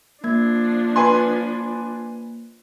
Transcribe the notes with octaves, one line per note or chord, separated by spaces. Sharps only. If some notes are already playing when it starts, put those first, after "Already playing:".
F3 A#3 D4 G#6
B4 G#5 C6